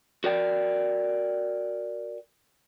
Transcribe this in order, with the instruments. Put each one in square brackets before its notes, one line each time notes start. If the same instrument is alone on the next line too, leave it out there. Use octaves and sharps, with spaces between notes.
[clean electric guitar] F#4 A#4 D5 G5